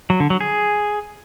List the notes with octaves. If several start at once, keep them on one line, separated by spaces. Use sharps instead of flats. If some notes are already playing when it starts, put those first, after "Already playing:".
F#3
D3
F#3
G#4